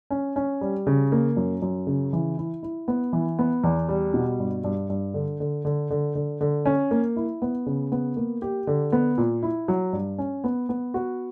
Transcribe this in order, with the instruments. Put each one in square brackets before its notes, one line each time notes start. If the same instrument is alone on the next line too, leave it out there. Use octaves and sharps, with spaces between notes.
[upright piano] C#4
C#4
G3
C#3
A#3
F#2
F#2
C#3
E3
E4
E4
B3
E3
B3
E2
G3
B2
G2
G2
G2
D3
D3
D3
D3
D3
D3
C#4
A#3
E4
B3
C#3
B3
A#3
G4
D3
B3
A#2
E4
F#3
G2
C#4
B3
B3
F#4